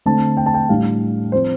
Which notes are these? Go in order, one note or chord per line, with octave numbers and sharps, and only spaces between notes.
D3 A3 C4 A5
G5
A5
G5
A2 G3 D4 F5
F3 C4 C5